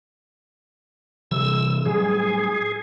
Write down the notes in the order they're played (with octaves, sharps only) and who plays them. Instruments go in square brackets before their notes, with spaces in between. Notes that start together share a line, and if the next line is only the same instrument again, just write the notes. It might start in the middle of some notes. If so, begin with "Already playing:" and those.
[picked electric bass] C3 E3 G3 [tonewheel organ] E6
[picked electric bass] A2 F#3 G3 [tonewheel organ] G#4